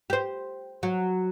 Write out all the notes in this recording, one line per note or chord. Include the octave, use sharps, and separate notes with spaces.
G4 C5
F#3